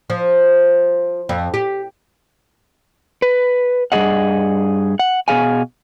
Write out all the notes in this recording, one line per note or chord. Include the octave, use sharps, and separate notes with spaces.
F3
F2
G4
B4
G2 D#3 G#4 D#5 F#5
F#5
B2 D#3 G#4 F5 G#5